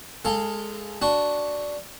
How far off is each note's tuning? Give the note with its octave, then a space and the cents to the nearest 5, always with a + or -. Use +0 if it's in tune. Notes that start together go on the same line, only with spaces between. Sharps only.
G#3 +0 A4 +20 F5 +0
D4 -5 F#4 +0